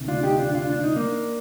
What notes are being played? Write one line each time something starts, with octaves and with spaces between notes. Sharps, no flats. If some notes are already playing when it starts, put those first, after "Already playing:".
Already playing: D2 C3 D#3
D4 F4
D#4 G4
D4 F4
D4 F4
D4
D#4
A#3 D4